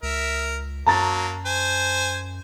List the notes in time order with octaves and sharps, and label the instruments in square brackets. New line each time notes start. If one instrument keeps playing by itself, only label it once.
[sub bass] C#2 [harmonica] A#4 E5
[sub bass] F#2 [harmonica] F#3 A#3 [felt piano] A5 A#5 A6
[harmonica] C5 G#5